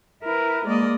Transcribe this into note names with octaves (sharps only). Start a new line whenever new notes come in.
E4 A#4 B4
G#3 A#3 D5 D#5